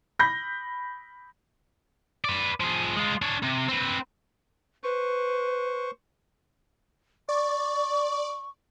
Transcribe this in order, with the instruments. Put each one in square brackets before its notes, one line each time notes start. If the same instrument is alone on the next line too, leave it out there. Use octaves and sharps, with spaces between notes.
[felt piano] B5 G6 A#6
[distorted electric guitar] B4 D5
F3 G#4
G#3 F4
D4 C#5
C3
C4 B4
[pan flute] B4 [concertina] C5 C#6
[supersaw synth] D5 [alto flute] C#6